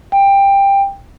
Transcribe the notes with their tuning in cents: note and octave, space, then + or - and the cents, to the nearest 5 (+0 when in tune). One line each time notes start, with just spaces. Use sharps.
G5 +15